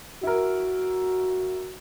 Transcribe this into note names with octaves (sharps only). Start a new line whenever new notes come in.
E4 F#4 A#4